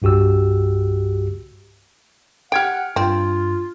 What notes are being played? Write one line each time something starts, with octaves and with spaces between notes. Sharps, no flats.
C2 G2 F#4 G4 E6
G4 F#5 G5 F6 G#6 D7
G2 C4 F4